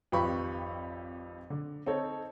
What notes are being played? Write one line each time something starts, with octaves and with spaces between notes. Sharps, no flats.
G#1 F2 G4 B4 B5 C#6
D3
C4 D#4 A4 C#5